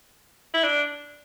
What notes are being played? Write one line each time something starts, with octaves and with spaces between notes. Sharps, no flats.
E4
D4